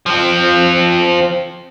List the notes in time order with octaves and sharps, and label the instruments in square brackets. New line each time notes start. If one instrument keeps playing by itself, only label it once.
[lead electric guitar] F3 C4